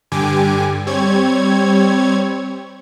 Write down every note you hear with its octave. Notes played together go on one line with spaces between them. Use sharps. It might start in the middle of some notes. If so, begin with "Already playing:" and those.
G2 D3 G4 G#5 D6
G3 C4 C#5 G#6